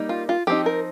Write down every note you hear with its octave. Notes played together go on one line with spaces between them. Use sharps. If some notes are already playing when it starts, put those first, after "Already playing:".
Already playing: G3 A#3 D#4
F4
F4
F3 C4 D#4 G4
A#4